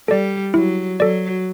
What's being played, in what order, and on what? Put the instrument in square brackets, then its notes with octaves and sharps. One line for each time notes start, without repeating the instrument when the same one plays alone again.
[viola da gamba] G3 [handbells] A4 D5
[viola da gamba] F#3 [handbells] E4
[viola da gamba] F#3 [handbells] A4 D5